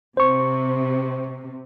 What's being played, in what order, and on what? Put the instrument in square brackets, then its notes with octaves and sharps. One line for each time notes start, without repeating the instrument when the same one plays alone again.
[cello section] C3 [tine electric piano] C5 C#6